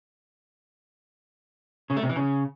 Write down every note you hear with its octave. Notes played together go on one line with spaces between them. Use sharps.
C#3
A3
C3
E3
C#3